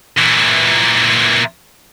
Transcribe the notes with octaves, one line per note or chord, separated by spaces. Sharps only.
A#2 E3